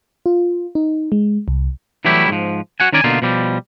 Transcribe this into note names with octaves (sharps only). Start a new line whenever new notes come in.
F4
D#4
G#3
C2
E3 F#3 G3 A3 E4 G4
G#2 F3
F#4 F#5 G#5
D#3 C#4 A#4 D5 G#5
B2 D3 A#3 D#4 F4
B2 F3 G3